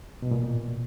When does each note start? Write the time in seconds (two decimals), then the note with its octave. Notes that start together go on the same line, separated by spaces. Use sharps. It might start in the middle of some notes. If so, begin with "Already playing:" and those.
0.22 B2
0.31 A#2